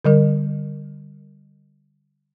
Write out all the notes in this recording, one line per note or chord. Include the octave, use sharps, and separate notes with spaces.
D3 G3 A#4